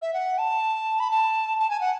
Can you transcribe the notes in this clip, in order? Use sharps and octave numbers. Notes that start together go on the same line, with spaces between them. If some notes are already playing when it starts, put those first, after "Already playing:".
E5
F#5
A5
B5
A5
A5
G#5
F#5